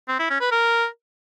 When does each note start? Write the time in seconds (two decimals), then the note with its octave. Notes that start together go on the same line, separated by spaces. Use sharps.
0.09 C4
0.19 E4
0.30 C#4
0.41 B4
0.52 A#4